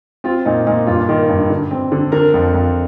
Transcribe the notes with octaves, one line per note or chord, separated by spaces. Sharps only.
C4 F4
A#2 D#4
A#2 D#4
G2 F4
D#3
G2
D3
C4
D3
D3 A#4
F2
F2